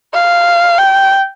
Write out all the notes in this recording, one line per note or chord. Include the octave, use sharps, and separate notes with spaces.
F5
G5